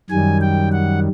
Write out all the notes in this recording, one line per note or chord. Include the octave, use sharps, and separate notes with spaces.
F#2 D#3 G3 G#5
G5
F#5